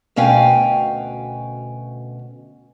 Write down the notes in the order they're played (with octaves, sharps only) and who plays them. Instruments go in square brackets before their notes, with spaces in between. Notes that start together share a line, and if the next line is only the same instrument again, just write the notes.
[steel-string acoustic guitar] D2 B2 C#4 F5 G5 G#5